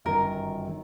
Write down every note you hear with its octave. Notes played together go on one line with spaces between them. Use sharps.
G1 F#2 D#3 A#4
D#3